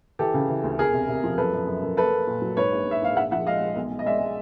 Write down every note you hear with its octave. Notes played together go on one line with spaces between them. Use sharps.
E3 G4 A4
C#3
E3
D2
E1 G#4 A#4
C3
C3
F3
F#2 A4 B4
F#2
F#2
F#2
A#3 A4 B4
A#3
A#2
F#3
G#2 B4 C#5
A#1
G#2 E5
A#1 F5
A#1 E5 F#5
F3 E5 F#5
G#3 D#5 F5
G#3
B1
G#3
D#5
G#3 D5 E5
G#3